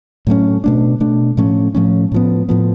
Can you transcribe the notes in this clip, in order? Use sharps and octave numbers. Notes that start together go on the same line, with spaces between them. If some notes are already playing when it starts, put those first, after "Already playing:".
A2 F#3 A3 C#4
B2 A3 D4
B2 A3 D4
A2 F3 A3 C#4
A2 F3 A3 C#4
A2 F3 B3
A2 F3 B3